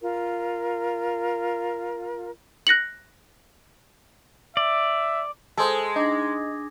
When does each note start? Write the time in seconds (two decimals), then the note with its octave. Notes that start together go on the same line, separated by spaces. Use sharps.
0.01 F4 A#4
2.67 F#6 A#6 C#7 F#7
4.57 D5 E5
5.58 G#3 A4 C5 G#5 A5 D#6
5.96 D4 D#4 D6 A#6